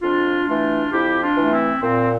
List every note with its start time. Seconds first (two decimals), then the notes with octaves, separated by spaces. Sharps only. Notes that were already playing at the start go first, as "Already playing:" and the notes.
0.02 F2 D4 F4
0.47 E3 A3 D4 F4
0.92 F2 E4 G4
1.22 D4 F4
1.37 E3 A3
1.52 C4 E4
1.82 A#2 C4